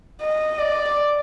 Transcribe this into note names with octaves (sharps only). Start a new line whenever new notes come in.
D#5
D5